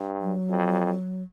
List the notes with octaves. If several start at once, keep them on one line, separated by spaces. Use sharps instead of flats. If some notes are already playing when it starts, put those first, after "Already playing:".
Already playing: G2
F#3
F2